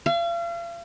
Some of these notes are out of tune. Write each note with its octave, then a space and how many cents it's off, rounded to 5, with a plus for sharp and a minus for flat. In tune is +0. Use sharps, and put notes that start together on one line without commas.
F5 -40